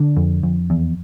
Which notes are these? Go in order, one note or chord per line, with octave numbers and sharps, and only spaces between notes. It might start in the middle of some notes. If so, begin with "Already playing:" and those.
Already playing: D3 D4
F2
F2
E2